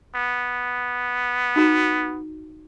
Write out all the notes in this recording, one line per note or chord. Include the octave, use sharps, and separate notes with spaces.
B3
D#4 F#4 A#5